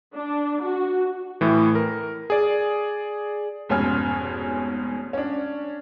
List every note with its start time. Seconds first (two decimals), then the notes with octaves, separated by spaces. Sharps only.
0.14 D4
0.62 F#4
1.41 A2 E3
1.75 A#4
2.30 G#4 D5
3.69 F1 G#2 B2 C#4 G#5 F6
5.13 C#4 D4